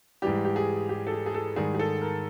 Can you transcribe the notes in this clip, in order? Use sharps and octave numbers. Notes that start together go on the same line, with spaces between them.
G#2 E3 G3 G4
G4
G#4
G4
A4
G#4
G#4
A4
G#2 D#3 G3 G#4
G#4
A4
A#4